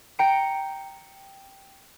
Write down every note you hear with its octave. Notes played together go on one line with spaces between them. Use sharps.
G5 A#5 C#7 D7